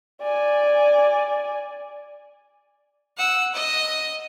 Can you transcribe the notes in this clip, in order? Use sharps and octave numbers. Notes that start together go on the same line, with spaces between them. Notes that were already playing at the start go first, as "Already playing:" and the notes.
D5 G#5
F#5 E6
D#5